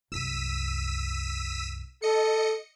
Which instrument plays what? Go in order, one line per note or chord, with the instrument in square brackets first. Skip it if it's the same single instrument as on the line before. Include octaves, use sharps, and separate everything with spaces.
[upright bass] C2 F#2 [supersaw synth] E6 B6 D#7
[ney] A4 [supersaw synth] D#5 C#7